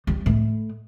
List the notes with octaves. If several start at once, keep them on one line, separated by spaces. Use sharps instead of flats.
G3
A2